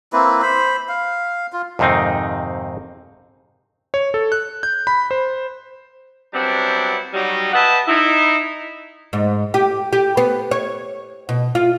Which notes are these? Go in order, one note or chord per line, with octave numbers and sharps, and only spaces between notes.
A#3 C4 E4 B4
C5 B5
F5
F4
F2 G#2 C3 D#3 C4 D#4
C#5
A4
F#6
G6
B5
C5
F#3 G3 B3 C4 D4 E4
F#3 G3 D#4
B4 D#5 E5 F#5 G5 A5
D#4 E4
G#2
G4
G4
B3
C#5
B2
F4